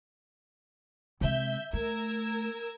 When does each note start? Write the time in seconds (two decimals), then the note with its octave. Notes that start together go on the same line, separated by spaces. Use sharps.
1.21 C3 G#3 E5 G6
1.73 A3 A#4 E6 G#6